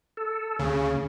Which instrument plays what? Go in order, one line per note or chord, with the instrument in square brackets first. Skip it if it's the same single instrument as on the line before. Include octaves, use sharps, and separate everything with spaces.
[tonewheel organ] A4
[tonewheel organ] D2 [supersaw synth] C#3